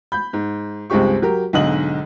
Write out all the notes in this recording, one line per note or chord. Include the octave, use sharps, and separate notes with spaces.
B5 G6
G#2
C#2 G2 G#3 C4 G4 C#6
F#3 G4 A#4
B1 G#2 D3 D#5 F#7